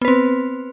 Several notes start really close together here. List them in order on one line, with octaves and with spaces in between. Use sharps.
B3 B4 C4